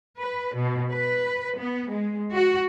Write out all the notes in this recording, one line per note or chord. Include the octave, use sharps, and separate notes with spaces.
B4
B2
B4
B3
G#3
F#4